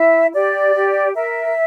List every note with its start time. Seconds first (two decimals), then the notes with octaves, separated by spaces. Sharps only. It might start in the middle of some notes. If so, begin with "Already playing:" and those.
Already playing: E4 E5
0.35 G4 D5
0.75 G4
1.15 A#4 E5